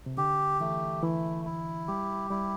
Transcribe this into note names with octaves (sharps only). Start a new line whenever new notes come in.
C3
D3 G4
E3 A3
E3 E4
E4
G3 G4
G3 E4